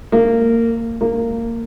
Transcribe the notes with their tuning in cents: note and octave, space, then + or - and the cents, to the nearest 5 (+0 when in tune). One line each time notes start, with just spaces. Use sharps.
A#3 -20
A#3 -15